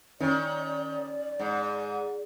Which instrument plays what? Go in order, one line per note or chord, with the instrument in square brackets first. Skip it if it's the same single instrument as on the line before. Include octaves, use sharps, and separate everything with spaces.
[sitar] D#3 [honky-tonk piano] C#4 [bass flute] D5
[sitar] G#2